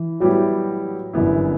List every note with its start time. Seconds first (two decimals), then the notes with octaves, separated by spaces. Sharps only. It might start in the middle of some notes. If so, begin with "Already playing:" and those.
Already playing: E3
0.20 A2 F#3 G3 B3 E4 G4
1.13 G1 F#2 E3 B3 E4